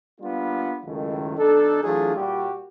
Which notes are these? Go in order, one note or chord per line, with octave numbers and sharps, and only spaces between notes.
G3 A#3 B3 D4 F4
C#2 F#2 A2 D#3
B1 D4 D#4 A4
E3 F#3 A3 D4 F4 G#4
A#2 G3 F#4 G4